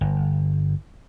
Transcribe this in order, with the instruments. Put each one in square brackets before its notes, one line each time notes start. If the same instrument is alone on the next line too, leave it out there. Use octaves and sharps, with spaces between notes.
[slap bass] G1